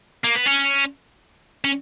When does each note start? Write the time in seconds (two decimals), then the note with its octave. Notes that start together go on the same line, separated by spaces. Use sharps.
0.25 A#3
0.36 B3
0.46 C#4
1.65 C#4